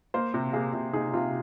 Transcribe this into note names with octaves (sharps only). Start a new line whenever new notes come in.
A#3 C5
C3
A#3 G#4
C3
D#4 G#4
C3 F4